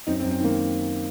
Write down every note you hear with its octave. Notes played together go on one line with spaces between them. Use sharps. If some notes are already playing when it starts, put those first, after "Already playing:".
F#2 C4 D#4
C4
F#2
C4
D#3 A#3